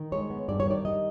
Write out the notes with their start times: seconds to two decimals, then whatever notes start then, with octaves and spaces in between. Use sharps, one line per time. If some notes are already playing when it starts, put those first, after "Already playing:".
Already playing: D#3
0.12 G#3 C#5
0.30 B3
0.48 G2 D5
0.60 C#5
0.66 D#3 D5
0.85 G3 D#5